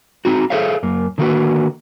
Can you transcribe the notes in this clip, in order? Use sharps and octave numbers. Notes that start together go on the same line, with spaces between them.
C4 D#4 F#4
G#4 A4 C5 C#5 E5 F5
F#2 A#3
D3 D#3 A3 A#3 F#4 B4